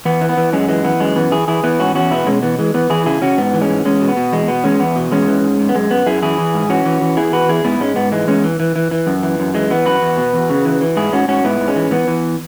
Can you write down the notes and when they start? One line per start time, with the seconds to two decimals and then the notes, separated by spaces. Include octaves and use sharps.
0.05 E2 B3
0.21 E3
0.29 B3
0.37 E3
0.53 F#2 G#3 C#4
0.68 E3 G#3
0.84 E3 B3
1.00 F#2 G#3
1.16 E3 B3
1.32 E3 E4 G#4
1.48 E3 E4 G#4
1.64 E3 B3 E4
1.79 G#2 C#4 F#4
1.95 E2 C#4 F#4
2.11 B2 B3 E4
2.27 B2 G#3 C#4
2.43 E3 B3
2.59 E3 G#3
2.74 E3 B3
2.90 E3 E4 G#4
3.06 C#3 E4 G#4
3.22 C#3 C#4 F#4
3.38 G#2 B3
3.53 E3
3.61 G#3 C#4
3.69 G#2
3.85 E2 G#3 C#4
4.01 B2
4.09 B3
4.17 B2
4.32 E2 G#3
4.48 B2 B3
4.64 E2 G#3 C#4
4.80 E2 B3
4.96 B2
5.11 E2 G#3 C#4
5.28 E3
5.44 G#2
5.59 G#2
5.69 B3
5.75 F#2 G#3
5.91 F#2 B3
6.06 F#2 E4 G#4
6.22 E3 E4 G#4
6.38 E3
6.54 G#2
6.70 E3 C#4 F#4
6.85 E3
7.01 E3
7.17 E2 E4 G#4
7.32 E3 F#4 B4
7.48 E2 E4 G#4
7.65 G#2 B3 E4
7.80 G#2 G#3 C#4
7.96 G#2 B3
8.12 E3 G#3
8.28 E2 G#3 C#4
8.44 E3
8.60 E3
8.76 E3
8.91 E3
9.07 F#2
9.23 E3
9.39 F#2
9.54 E3 G#3
9.70 E3 B3
9.86 F#2 F#4 B4
10.02 E2
10.18 B2
10.33 E2
10.50 C#3
10.65 E3
10.81 E3
10.97 G#2 E4 G#4
11.13 G#2 C#4 F#4
11.28 G#2 C#4 F#4
11.44 G#2 B3 E4
11.60 G#2
11.68 G#3 C#4
11.76 E3
11.91 E3 B3
12.08 E3